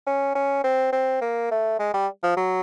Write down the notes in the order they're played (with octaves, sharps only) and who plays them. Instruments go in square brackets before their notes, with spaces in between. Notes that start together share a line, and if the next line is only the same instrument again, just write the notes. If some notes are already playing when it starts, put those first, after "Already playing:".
[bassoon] C#4
C#4
C4
C4
A#3
A3
G#3
G3
F3
F#3